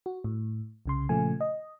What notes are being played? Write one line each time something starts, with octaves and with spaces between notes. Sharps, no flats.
F#4
A2
C2 C#3 C6
A#2 C#3 F3 A3 G#5
D#5